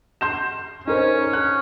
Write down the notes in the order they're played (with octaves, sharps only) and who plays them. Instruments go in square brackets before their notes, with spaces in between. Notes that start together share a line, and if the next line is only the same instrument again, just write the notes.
[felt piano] C6 G6 E7
[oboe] C#4 [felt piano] D#4 A#4 C5
[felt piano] F#6